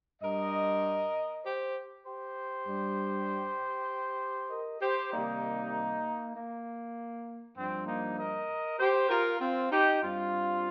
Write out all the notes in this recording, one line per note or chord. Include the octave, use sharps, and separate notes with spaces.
G2 G3 A#4 D#5
G4 C5
G4 C5
G2 G3
A#4 D#5
G4 C5
C3 D#3 G3 A#3 D#4
A#3
G2 F3 C4
A#3 D#4
A#4 D#5
G4 C5
F4 A#4
C4 F4
D#4 G4
G2 G3 C4 F4